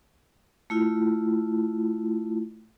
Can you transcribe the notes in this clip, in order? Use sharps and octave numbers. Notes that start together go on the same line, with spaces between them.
A3 E4 F4